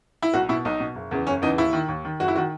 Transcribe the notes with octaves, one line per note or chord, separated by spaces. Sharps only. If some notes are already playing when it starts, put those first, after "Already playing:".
E4
B1 F#4
B2 E4
B1 D#4
B2
F#1
E2 C#3 E3
F#1 C#4
E2 C#3 E3 D#4
D#2 E4
D#3
D#2
D#3
F#1 F#4
E4
D#3 F#4